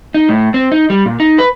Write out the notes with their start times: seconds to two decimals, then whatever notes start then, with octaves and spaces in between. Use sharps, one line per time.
0.14 D#4
0.29 A2
0.54 C4
0.72 D#4
0.90 G3
1.06 A#2
1.20 D#4
1.38 B4